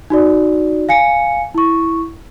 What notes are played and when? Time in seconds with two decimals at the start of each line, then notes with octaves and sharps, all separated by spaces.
0.10 D#4 F#4 D5
0.89 F5 G#5 C#7
1.55 E4 C#6